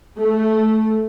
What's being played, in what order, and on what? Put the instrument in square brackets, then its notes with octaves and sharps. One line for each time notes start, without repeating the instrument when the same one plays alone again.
[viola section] A3